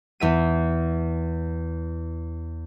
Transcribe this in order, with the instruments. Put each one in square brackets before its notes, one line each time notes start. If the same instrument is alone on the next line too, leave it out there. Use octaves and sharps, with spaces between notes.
[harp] E2 E5 D#7